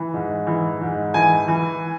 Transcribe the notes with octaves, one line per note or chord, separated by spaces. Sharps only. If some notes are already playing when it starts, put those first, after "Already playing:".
Already playing: E3
G#2
E3
G#2
E3 G#5
E3